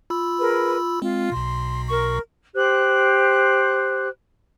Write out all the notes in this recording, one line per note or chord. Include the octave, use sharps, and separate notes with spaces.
F4 B5 E6
G#4 A#4 B4
G#3 C4 F4
B1 B2 C6
A#4 C#6
G4 C5 F#6